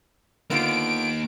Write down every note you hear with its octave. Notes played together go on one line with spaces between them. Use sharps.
D3 A#3 B3 D#4 F4 D7